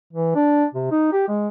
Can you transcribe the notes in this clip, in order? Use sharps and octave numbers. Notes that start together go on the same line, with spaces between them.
E3
D4
C3
D#4
G4
G#3